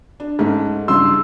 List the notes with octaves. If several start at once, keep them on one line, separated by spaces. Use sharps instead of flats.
D4
G#2 A3 C#4
C2 G2 C#3 C6 E6